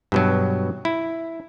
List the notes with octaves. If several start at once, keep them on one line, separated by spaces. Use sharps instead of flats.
G2 B2 F#3
E4